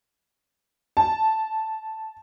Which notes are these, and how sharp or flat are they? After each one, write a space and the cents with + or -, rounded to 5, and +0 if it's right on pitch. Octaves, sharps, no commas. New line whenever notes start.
A5 -5